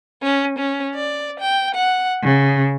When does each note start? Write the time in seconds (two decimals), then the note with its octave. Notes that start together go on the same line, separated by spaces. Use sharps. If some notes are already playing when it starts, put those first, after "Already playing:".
0.23 C#4
0.57 C#4
0.96 D5
1.40 G5
1.76 F#5
2.25 C#3